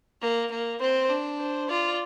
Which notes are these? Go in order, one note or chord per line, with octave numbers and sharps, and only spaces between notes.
A#3
A#3
C4 C5
D4
C5
F4 D5